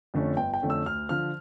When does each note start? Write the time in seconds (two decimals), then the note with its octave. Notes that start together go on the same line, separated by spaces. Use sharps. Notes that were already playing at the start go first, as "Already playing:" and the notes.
0.14 F2 D3 A3 C#4
0.37 G1 G5
0.54 G5
0.61 F2 D3 A3 C#4
0.70 E6
0.86 D2 F6
1.09 D3 F3 F6